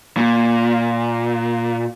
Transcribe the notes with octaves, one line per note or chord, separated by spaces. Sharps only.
A#2